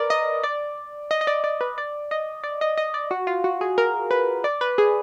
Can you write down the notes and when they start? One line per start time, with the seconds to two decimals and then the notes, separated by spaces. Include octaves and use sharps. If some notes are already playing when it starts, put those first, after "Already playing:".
Already playing: A#4 B4 D5
0.10 D#5
0.43 D5
1.11 D#5
1.21 D#5
1.27 D5
1.44 D5
1.61 B4
1.78 D5
2.11 D#5
2.44 D5
2.61 D#5
2.78 D#5
2.94 D5
3.11 F#4
3.27 F4
3.44 F#4
3.61 G#4
3.78 A#4
4.11 B4
4.44 D5
4.61 B4
4.78 G#4